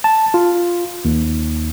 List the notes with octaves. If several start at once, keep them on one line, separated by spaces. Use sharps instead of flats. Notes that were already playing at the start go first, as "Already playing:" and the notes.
A5
F4
D#2